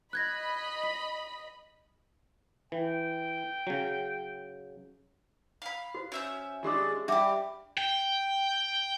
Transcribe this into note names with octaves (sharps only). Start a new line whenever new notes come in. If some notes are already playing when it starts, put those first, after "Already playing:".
D#5 B5 F#6 G#6 A#6
B6
E3 G5
C#3 F#3
F5 B5
F#4 C5
C#4 E5 G6
D#2 G#3 D4 F4 G4 D6
G3 D4 F#4 G4 E5 D6
G5